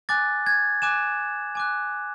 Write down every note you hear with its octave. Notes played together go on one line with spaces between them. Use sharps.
G#5 D6 F#6 A6
G#6
G#5 D6 F#6 E7
G#5 D6 F#6